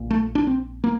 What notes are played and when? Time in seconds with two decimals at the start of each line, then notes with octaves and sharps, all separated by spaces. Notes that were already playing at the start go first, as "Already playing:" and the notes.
Already playing: A#1 A#2
0.10 A3
0.35 D4
0.47 C4
0.84 A#3